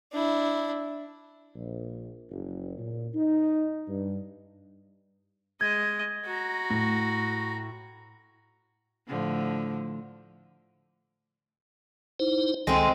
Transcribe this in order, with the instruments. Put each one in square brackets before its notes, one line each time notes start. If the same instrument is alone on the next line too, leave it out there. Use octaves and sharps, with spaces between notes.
[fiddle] D4 E4
[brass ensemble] A#1
F#1
A#2
D#4
G2
[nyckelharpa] G#3 D#5 [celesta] G#6
[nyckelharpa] F#4 A#5
[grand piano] A2
[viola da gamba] A2 D3 F3
[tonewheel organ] D#4 E4 C5
[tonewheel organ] C#2 D#3 A4 [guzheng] G#3 C4